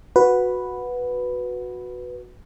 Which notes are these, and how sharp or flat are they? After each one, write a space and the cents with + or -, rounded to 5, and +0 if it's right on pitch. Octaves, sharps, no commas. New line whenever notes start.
F#4 -10 B4 +0